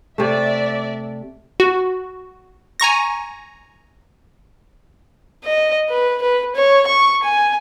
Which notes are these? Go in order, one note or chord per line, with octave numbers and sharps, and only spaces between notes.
C3 A3 D5 E5
F#4
G#5 A#5 C#6 A#6
D#5
B4
B4
C#5
C#6
G#5